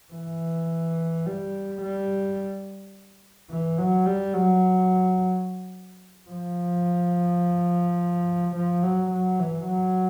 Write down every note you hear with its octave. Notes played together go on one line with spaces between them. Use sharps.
E3
G3
G3
E3
F#3
G3
F#3
F3
F3
F#3
F#3
E3
F#3